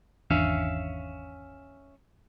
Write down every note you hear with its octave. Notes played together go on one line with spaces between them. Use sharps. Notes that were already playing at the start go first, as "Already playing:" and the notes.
G#1 E2 C#4 D4 E5 F5